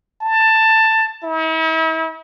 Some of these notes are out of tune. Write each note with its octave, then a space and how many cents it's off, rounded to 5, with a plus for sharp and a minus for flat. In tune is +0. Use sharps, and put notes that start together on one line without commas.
A5 +10
E4 -45